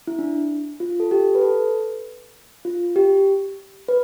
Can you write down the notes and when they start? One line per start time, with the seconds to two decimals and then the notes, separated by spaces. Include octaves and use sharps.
0.07 E4
0.19 D4
0.80 F4
1.00 A4
1.11 G4
1.35 B4
1.41 A4
2.65 F4
2.96 G4
3.89 B4